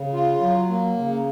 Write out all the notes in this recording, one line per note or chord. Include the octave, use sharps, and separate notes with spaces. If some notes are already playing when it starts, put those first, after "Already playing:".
Already playing: C#3
F4
F#3
A#3
C#3